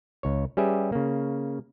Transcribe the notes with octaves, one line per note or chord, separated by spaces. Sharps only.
C#2 C#5
G3 C#4 G4 G#4 B4 E5
C#3 A#3